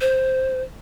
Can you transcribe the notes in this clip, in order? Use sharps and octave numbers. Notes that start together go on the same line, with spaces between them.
C5